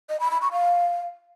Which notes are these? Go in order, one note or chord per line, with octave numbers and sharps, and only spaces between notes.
D#5
B5
B5
C#6
F5